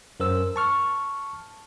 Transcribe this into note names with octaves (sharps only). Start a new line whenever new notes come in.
F#2 A#4 C5 E6
A5 C#6 F6